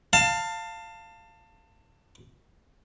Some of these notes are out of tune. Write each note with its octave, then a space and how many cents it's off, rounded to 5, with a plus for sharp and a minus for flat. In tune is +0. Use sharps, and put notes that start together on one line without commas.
F5 +0 A5 +25